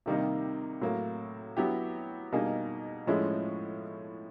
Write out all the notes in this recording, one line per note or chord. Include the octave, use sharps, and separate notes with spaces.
C3 D#3 G3 A#3 D#4
A2 F#3 A#3
F#3 B3 E4 G4
B2 G3 A#3 D#4 G#4
A2 F3 G#3 C#4 E4